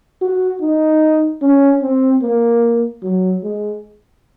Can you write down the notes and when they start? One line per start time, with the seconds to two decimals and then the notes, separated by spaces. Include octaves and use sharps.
0.22 F#4
0.62 D#4
1.42 C#4
1.82 C4
2.22 A#3
3.03 F#3
3.44 G#3